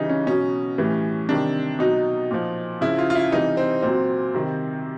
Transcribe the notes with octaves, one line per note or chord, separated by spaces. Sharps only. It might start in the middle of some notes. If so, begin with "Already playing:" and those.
Already playing: C#3 E3 G3 D#4
C#4
B2 F#3 C#4
A2 E3 G3
C3 D#3 G3 D4
B2 F#3 D#4
A#2 F3
C#3 F3 E4
F4
F4
E4
C3 E3 G3 D#4
C4
A#2 F#3 C4
C3 D#3 G3